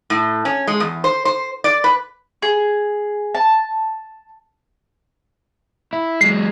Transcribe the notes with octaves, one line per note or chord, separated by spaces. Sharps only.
A2
C#4
G#3
E2
C5
C5
D5
B4
G#4
A5
E4
F#3 G#3 C7